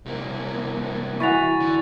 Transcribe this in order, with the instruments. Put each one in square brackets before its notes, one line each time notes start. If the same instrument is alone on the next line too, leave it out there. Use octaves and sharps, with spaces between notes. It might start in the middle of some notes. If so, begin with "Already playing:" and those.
[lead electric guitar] C2 A#3
[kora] E3 F#4 [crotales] C#6 A6 F7
[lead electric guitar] D3